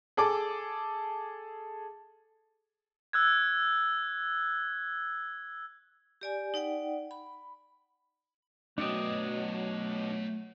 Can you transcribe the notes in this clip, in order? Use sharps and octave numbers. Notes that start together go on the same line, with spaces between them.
G#4 A4 A5 D6
E6 F#6 G#6
G4 D5 G#5
D#4 D5 F#5 G5
B5
B2 F#3 A3 D4 D#5 G5